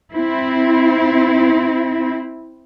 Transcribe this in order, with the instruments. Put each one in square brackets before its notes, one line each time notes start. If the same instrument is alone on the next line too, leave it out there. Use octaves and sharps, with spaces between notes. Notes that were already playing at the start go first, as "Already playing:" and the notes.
[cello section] C4 E4